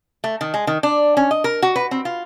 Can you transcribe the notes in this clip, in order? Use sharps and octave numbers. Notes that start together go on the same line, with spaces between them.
A3
D#3
G#3
D#3
D4
C#4
D#5
A#4
F#4
B4
C4
F4